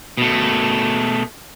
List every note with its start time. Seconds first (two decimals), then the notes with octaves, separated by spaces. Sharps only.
0.17 B2 A3